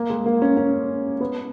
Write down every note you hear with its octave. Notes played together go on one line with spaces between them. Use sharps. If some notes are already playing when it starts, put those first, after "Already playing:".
Already playing: A#3
G#3
A#3
C#4
C#4
B3